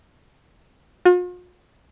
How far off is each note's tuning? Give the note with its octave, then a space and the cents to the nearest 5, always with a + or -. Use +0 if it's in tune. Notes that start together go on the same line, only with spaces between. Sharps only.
F4 +45